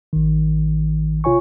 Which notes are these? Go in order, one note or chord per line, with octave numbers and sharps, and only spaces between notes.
A1 D#3
C3 F4 C#5 G#5 C#6